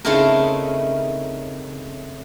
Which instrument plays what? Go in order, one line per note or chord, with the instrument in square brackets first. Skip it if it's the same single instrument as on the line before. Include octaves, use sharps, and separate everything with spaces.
[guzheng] C#3 A3 C4 D#4 E4 A#4